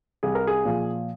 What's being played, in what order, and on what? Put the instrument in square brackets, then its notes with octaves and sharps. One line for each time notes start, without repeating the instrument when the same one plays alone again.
[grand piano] C2 G#4
A#4
G#4
A#2 F3